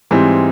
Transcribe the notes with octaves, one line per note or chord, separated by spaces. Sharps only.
G#2 E3 G3 C4